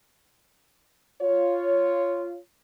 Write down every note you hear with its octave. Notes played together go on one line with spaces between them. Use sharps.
F4 C#5